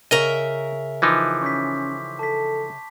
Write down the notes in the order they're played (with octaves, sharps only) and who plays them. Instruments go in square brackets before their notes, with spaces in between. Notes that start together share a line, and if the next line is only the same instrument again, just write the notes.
[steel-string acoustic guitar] C#3 A#4 E5 [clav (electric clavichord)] D#5 A#5
[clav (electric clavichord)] E3 F3 D#4 [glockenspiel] C6 D6 B6
[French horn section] C#4 [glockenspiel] C#6 G6 B6
[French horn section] A4 [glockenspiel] A5 B6